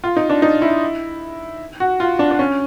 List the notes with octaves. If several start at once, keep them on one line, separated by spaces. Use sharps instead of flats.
F4
D#4
D4
D#4
E4
F#4
F4
D4
D4
C#4